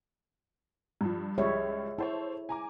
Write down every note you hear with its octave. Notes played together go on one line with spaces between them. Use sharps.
G2 F3
C#2 F3 G3 G#4 C#5 E5
E4 A4 C5 C#5
G#5 A#5 D6